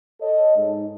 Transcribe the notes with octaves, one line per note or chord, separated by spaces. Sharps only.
A4 C#5 D#5
G#2 D#4